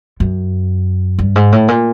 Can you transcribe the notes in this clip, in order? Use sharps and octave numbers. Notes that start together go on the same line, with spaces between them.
F#2
G2
G#2
A2
A#2